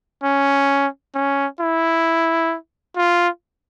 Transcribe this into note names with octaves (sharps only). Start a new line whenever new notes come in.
C#4
C#4
E4
F4